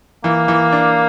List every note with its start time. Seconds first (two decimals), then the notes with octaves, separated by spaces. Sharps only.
0.24 E3 A#3
0.48 E3
0.72 D4